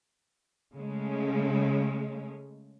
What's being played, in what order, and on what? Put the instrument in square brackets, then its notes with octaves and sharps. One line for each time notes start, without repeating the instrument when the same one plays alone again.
[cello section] C#3 G#3 A3 C#4